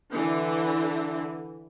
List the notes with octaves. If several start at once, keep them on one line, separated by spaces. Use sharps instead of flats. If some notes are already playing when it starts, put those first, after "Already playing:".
D3 E3